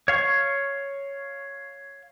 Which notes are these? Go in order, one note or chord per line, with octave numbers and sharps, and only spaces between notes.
C#5 F5 C#6